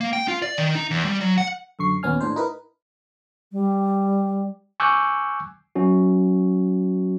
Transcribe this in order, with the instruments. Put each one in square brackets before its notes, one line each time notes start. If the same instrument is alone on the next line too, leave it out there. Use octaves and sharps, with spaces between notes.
[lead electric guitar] A#3
G5
F4
D5
D#3
D#4
E2
G3
F#3
F#5
[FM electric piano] F#2 D3 C#6 C7
D#2 A#2 B3 C#4 G#5 F6
A2 D4 C5
D#4 E4 A#4 B4
[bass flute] G3
[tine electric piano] G#5 C#6 D6 E6 F#6 G6
F#3 C#4 F#4